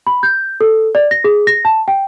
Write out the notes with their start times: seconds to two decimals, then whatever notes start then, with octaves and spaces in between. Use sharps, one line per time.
0.07 B5
0.23 G6
0.61 A4
0.95 D5
1.11 A#6
1.24 G#4
1.47 A#6
1.65 A5
1.88 G5